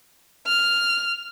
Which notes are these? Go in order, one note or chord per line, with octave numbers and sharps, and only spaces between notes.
F6